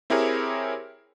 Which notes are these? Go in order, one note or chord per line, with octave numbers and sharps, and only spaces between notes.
C4 E4 G4 G#4 A#4 C#5